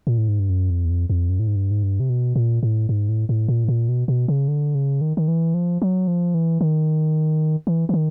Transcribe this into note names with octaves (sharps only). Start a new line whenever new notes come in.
A#2
A2
G#2
G2
F#2
F2
E2
F2
F2
F#2
A2
G#2
G2
G#2
G2
C3
B2
A#2
A2
G#2
A2
A2
A#2
A2
A#2
B2
B2
C#3
D3
C#3
D#3
D#3
E3
F3
F#3
F3
E3
D#3
E3
E3
D#3